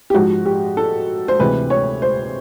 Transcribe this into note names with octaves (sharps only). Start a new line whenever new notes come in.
G4
G#2 F3 G#3 F#4
G4
A4
C5
D2 C3 E3 G#3 B4
C#5
C5